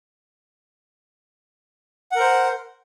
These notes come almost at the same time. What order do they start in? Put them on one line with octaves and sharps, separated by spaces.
F#5 A#4 C5